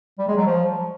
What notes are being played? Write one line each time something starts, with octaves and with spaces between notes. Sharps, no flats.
G3
G#3
F#3
F3